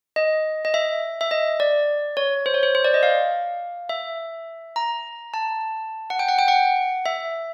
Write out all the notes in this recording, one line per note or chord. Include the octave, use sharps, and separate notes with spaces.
D#5
D#5
E5
E5
D#5
D5
C#5
C5
C#5
C5
C5
D5
D#5
F5
E5
A#5
A5
F#5
G5
F#5
G5
F#5
E5